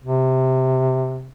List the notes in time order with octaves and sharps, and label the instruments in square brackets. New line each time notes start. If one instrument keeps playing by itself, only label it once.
[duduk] C3